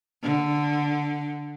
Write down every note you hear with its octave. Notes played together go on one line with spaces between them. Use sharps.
D3